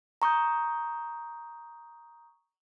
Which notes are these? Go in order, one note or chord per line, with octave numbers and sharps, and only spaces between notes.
A#5 C#6 D#6 G6